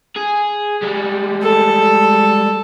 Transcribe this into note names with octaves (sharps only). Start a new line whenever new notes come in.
G#4
G3 G#3
A4